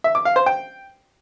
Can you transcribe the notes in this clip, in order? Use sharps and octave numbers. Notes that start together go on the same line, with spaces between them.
E5
D6
F5
C5
G5